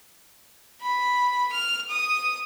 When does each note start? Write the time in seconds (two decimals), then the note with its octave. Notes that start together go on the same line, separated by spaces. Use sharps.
0.81 B5
1.52 F6
1.89 D#6